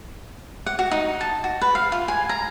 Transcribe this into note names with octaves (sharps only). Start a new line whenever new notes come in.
F#5
F#4
D#4
A5
F#4
B4
F5
F4
G#5
A#5